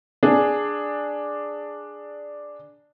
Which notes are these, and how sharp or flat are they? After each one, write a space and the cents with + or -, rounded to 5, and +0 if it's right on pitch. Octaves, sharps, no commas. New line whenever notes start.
D4 +0 G#4 +0